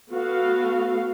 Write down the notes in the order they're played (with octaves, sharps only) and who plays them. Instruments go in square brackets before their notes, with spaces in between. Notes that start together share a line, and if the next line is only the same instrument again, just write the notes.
[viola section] A3 B3 F#4 A4 F5